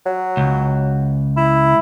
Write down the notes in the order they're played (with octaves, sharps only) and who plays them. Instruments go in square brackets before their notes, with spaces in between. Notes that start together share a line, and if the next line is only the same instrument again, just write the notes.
[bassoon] F#3
[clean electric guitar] C#2
[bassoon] E4